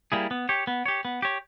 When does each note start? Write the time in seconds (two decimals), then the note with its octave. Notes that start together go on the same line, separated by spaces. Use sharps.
0.12 G3 A#3 E4 G#4
0.31 B3
0.49 G4 C#5
0.67 B3
0.86 G4 C#5
1.05 B3
1.22 G4 C#5